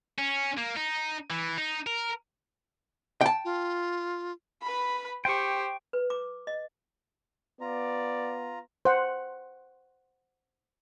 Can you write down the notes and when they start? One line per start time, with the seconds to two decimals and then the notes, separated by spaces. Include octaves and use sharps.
0.19 C#4
0.58 A#3
0.77 D#4
1.30 E3
1.58 D#4
1.87 A#4
3.21 G5 A5
3.45 F4
4.62 B4 B5
5.25 G4 C5 G5 C#6
5.93 B4
6.10 D6
6.47 D#5
7.61 B3 F4 D5 A#5
8.85 C5 F#5